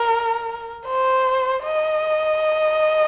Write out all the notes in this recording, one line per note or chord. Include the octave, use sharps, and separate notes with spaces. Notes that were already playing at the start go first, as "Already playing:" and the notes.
Already playing: A#4
C5
D#5